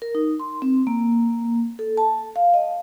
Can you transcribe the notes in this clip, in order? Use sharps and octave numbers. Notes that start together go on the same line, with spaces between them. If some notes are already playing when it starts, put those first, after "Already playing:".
A#4
D#4
C6
C4
A#3
A4
A5
F5
D#5